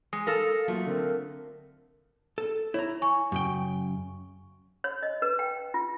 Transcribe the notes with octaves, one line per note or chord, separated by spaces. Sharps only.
G#3 D#6 C#7
A4 A#4 F5
F#3 A3 A#3 F4
D3 C4 A#4
A4
E4 C#5 A#5
G#5 C#6
F#2 C#3 G5
C#5
D#5
B4
G5
F4